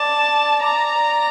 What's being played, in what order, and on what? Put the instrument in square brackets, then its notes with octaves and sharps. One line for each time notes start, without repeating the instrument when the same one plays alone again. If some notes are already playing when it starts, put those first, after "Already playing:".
Already playing: [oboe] D5 [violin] A5
[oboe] D5 [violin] A#5